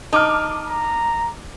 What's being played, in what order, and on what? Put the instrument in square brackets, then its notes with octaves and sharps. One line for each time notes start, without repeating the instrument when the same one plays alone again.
[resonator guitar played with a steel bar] D#4 [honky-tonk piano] A5 D6 F6
[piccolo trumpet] A#5